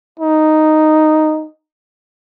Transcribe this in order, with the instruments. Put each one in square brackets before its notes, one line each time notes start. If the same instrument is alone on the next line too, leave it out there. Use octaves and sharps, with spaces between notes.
[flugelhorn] D#4